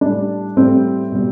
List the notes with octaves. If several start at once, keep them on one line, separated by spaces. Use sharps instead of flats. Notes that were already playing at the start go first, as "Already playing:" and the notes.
A2 G3 D4
A2 G3 C4
B2 G3